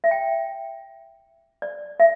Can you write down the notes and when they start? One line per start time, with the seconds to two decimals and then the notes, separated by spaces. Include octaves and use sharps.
0.04 E5
0.11 G5
1.62 D5
2.00 E5